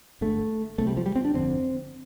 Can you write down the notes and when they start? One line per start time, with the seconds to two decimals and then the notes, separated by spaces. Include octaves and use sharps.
0.21 G1 G2 D3 A3
0.78 C2 C3 A3
0.87 G3
0.97 F3
1.06 G3
1.16 C4
1.25 D4
1.34 G1 F2 D3 C4